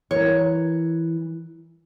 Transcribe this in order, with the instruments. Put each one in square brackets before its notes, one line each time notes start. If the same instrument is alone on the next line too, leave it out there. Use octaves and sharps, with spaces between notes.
[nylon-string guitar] E3 A#4 [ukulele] C#5